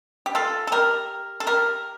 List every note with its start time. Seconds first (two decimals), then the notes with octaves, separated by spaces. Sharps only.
0.26 G4
0.35 F4 A4
0.67 A4
0.72 G4 A#4
1.40 A4
1.47 G4 A#4